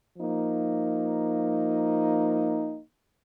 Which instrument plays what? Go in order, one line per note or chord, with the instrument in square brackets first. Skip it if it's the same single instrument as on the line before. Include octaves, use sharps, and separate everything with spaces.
[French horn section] F3 A#3 D#4